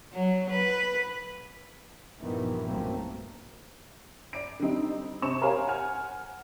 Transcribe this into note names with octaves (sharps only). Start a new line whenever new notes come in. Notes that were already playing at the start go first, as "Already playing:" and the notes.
F#3
B4
A#1 G2 D#3 E3 B3
B1 G2 F#3 A3 A#3 C4
D5 D7
D3 G3 C4 D#4
C3 C5 C#6 E7
G4 A#4 C5 C#5 F5 G#5
F#5 G#5 F6